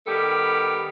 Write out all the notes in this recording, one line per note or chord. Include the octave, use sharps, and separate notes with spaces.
D#3 G3 B3 G4 A4